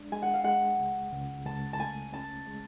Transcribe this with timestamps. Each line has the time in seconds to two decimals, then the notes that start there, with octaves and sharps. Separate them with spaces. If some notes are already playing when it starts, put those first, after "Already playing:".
Already playing: G#3 D4
0.12 G#3 G#5
0.22 F#5
0.34 F5
0.44 G#3 F#5
0.79 C#2
1.12 C#2
1.46 C#2 A5
1.73 A5
1.80 A3 G#5
2.13 C#4 A5
2.47 G#3